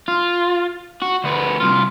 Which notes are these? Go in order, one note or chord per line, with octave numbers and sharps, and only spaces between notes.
F4
F#4
D2 B3
C2 F4